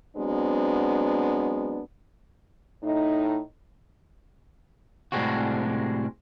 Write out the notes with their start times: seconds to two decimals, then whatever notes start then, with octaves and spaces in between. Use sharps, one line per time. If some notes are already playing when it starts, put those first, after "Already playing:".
0.17 F#3 G#3 B3 C4 D4
2.83 A2 D#4
5.12 A2 C3 G3 G#3 C4 F#4